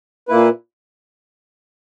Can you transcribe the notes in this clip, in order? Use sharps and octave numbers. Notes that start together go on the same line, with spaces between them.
A#2 A#3 E4 B4